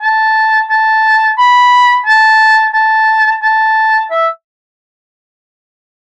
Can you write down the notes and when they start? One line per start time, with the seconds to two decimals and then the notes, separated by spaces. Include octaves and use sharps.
0.01 A5
0.70 A5
1.38 B5
2.05 A5
2.73 A5
3.42 A5
4.11 E5